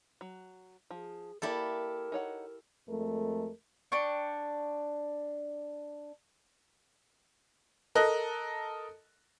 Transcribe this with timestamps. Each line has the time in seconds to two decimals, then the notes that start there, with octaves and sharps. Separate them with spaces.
0.21 F#3
0.91 F3 G#4
1.42 A#3 E4 G4 A4 A#4 D5
2.12 D#4 C#5 F#5
2.87 F2 G#3 A3 A#4
3.92 D4 G5 C#6
7.95 A4 A#4 D#5 F#6